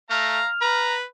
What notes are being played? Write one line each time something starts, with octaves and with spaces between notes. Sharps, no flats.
A3 F5 A#5 F6
B4 A#5